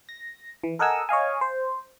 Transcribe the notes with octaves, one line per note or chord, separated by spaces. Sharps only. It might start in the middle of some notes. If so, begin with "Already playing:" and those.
A#6
E3
A4 A#4 D#5 F#5 G#5 E6
C#5 D#5 F5 G#5
C5